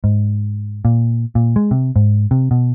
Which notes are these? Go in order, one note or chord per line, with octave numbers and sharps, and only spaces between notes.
G#2
A#2
A#2
G#3
C3
G#2
C3
B2